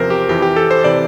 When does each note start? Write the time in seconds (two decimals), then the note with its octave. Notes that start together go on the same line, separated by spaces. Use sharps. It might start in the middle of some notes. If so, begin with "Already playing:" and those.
Already playing: E2 C3 F3 A#4 C5
0.10 G4
0.29 F2 E3 G4
0.42 G4
0.56 A4
0.71 C5
0.84 C3 E3 D5